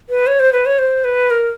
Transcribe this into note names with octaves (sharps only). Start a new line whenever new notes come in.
B4
C#5
C5
B4
C#5
C5
B4
A#4